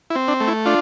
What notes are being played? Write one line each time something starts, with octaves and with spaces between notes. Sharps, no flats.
E4
C4
D4
A3
E4
D4 F4